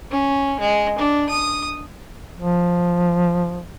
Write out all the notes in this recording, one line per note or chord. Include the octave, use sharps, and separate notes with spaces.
C#4
G#3
D4
D#6
F3